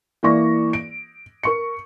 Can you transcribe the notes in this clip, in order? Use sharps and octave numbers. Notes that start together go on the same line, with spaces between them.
E3 A#3 D5 C#6 A#6
D7
A#4 C#6 C#7